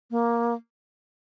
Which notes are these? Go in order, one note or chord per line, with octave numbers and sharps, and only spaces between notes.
A#3